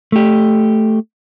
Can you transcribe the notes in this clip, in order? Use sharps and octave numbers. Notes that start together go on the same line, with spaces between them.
A3 G4